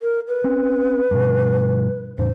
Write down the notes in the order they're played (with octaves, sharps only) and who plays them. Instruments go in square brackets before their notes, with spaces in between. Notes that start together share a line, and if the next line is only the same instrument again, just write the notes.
[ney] A#4
B4
[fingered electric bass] C4 C#4
G2 B2
[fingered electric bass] E2 A2 [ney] C5